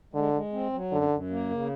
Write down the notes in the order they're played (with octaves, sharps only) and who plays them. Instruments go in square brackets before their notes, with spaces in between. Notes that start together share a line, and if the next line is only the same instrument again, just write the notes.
[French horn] D3 [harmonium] G#3
[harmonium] G#3
C4
F#3
[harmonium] F#2 [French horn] D3
[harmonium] F#2
A#3
C#3